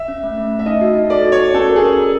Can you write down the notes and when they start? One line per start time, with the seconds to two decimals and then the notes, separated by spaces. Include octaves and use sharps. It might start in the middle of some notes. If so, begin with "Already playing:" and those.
Already playing: E5
0.08 C#4
0.23 A3
0.38 A3
0.52 A3
0.59 E5
0.66 D#4 D#5
0.81 F#4
0.95 D#4
1.10 A4 D5
1.25 F#4
1.32 C#5
1.39 F#4
1.54 C#4 A4
1.69 A#4
1.76 G#4
1.84 A#4
1.98 A#4